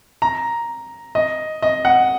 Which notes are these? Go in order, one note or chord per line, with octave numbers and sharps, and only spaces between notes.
A#5
D#5
D#5
F#5